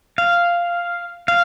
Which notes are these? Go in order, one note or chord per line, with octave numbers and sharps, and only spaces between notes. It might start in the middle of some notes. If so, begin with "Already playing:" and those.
F5
F5